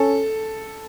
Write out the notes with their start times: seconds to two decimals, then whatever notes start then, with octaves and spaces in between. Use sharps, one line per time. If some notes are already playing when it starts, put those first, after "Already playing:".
Already playing: C#4 A4